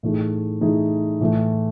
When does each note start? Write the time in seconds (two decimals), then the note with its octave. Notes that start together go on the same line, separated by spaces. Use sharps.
0.03 A2 E3 A3 D#4 G#4
0.61 A2 E3 A3 D#4 G#4
1.20 A2 E3 A3